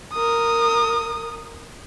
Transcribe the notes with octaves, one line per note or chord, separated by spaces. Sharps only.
A#4 D#6